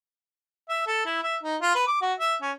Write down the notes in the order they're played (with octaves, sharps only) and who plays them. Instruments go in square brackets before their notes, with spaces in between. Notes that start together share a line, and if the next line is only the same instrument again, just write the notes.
[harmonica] E5
A4
E4
E5
D#4
F4
B4
D6
F#4
E5
C#4